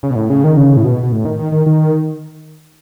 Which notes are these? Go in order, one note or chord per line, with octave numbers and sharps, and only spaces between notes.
C#3
B2
A2
C#3
D#3
C#3
A2
B2
B2
A2
D#3
D#3
D#3
D#3